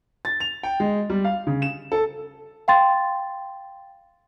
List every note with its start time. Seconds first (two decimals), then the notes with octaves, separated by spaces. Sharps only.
0.25 A6
0.40 F7
0.63 G5
0.80 G#3
1.10 G3
1.25 F5
1.47 C#3
1.62 E7
1.92 A4
2.68 F5 G5 C6 A6